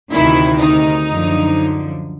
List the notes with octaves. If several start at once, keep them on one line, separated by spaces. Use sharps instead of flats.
D2 C3 D#3 E4
D#4
F#2 D3 F3